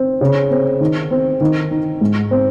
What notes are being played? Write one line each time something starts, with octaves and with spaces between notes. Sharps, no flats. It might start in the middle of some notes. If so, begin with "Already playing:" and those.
Already playing: C4
C#3
C4
D#3
C4
D#3
D#4
G#2
C4